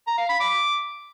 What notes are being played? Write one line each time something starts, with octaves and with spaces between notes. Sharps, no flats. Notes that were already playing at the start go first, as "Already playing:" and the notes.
A#5
F5
B5
D6